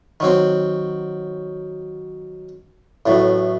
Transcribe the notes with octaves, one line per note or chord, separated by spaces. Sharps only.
D#3 F#3 C4
A1 A2 F#3